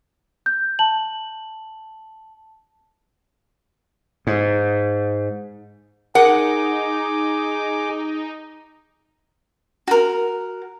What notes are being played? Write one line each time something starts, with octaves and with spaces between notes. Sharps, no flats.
G6
A5 F#7
G#2
D#4 G#4 A#4 F#5 D6
F#4 A#4